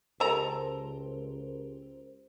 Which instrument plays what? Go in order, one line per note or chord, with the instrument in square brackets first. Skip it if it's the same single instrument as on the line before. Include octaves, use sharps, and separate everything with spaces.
[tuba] C#2 [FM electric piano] G4 A#4 C5 [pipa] A4 A#5